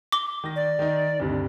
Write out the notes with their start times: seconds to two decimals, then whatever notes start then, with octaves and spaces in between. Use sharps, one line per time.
0.12 D6 G7
0.44 D#3 A#6
0.56 D5
0.79 D#3 D#4
1.20 D2 G2 C3